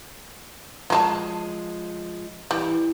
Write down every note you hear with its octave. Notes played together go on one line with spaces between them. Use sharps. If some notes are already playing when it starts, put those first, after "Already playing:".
F3 F#3 G#3 G#4 A5
E3 G3